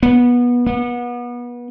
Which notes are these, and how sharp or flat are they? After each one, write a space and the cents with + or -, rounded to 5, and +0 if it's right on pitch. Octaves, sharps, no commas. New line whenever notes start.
B3 -20
B3 -30